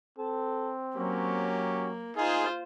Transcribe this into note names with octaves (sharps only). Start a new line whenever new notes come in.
C4 A4
F#3 A#3 C#4 F#4 G4
D#4 F4 G#4 C5